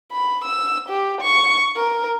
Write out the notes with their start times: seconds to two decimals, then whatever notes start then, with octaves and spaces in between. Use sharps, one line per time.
0.12 B5
0.45 E6
0.89 G4
1.21 C#6
1.76 A#4